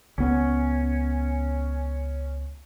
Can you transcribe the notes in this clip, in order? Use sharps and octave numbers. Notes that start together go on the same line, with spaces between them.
C#2 B3 C#4